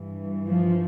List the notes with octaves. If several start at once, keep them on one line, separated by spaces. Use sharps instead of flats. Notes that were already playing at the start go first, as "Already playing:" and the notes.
Already playing: G2 E3
F3